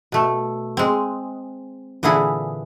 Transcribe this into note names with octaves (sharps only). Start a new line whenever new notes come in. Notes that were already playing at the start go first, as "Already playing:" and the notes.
B2 A3
G#3 C4
A#2 D3 E3 E4 G#4